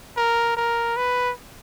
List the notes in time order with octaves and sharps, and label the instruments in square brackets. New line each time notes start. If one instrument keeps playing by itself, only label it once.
[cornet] A#4
A#4
B4